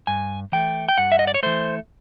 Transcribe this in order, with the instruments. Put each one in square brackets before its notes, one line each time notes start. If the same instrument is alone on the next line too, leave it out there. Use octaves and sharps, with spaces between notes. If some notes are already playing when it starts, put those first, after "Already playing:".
[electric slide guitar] G2 G#5
E3 A3 G5
G5
G2 F#5
E5
D#5
D5
C#5
E3 A3 C5